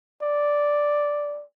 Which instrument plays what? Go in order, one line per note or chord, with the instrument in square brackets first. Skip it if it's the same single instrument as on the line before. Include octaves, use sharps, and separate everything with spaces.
[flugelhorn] D5